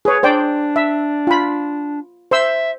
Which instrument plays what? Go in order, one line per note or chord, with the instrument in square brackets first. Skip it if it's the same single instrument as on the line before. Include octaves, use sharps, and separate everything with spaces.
[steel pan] G#4 C#5 [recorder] B4
[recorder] D4 [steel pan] C5 D5 G5
[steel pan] E5
F4 B5
[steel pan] C5 C6 E6 [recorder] E5